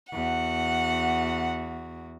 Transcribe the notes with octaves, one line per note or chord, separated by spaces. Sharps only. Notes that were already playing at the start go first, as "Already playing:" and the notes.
E2 F#4 F#5